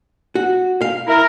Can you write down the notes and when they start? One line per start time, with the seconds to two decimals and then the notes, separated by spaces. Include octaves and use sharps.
0.35 F#4
0.81 F5
1.07 E4 A#4